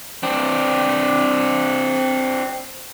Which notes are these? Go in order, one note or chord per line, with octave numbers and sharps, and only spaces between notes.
C4 D4